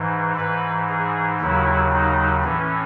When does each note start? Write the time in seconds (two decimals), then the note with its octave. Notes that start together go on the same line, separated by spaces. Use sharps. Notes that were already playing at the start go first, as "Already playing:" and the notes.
Already playing: G#2 E3
0.37 G#2 E3 B4
0.89 G#4
1.40 D#2 C#3 F#3 E4
1.93 D#4
2.44 A2 E3 C#4